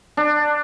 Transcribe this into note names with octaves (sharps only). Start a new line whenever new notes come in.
D4